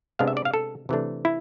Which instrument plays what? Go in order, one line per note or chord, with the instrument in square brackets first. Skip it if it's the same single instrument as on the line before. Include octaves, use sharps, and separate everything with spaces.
[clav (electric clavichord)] C3 G#3 B3 D4 F5
E5
D5
F5
A4
C3 E3 A3 D4
E4